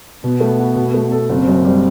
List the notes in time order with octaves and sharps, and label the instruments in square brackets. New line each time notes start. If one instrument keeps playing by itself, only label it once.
[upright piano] B2 [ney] B3
[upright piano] A3
F#4
B2
A3
A4
[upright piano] F#1 [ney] C4
[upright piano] F#2
G3